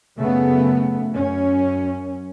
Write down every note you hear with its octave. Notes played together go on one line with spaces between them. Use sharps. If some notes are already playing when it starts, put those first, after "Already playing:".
F#2 C#3 A3 B3
F#2 C#4